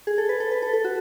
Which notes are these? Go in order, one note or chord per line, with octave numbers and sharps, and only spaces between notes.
G#4
A4
B4
A4
B4
A4
A4
F#4